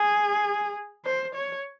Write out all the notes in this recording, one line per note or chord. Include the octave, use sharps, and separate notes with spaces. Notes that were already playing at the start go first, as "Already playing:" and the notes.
Already playing: G#4
C5
C#5